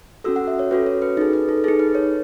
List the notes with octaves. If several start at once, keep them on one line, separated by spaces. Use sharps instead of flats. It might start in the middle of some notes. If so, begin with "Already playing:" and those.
C#4 F#4 A4 E6
F#5
E5
C#5
C#4 F#4 A4 B4
C#5
B4
D#4 G#4 A4
B4
A4
D#4 G#4 A4
B4
C#5